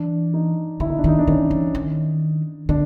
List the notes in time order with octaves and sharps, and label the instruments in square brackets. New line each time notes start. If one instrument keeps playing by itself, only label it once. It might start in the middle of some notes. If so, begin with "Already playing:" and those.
Already playing: [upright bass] E3 [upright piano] D4
[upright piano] D#4
[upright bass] D3 [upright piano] E4
[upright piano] D#4
D4
[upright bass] D#3 [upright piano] D#4
[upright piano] D4
[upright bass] D#3 [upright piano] C#4
[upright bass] E3
D#3
[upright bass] D3 [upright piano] D4